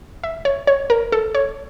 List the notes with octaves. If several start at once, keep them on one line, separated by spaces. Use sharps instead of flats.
E5
C#5
C#5
A#4
A4
C#5